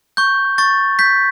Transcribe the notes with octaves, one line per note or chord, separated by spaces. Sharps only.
C#6 G6
C#6 A6
G6 B6